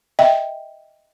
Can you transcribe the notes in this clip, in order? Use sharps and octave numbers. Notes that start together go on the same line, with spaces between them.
D#5 E5 G5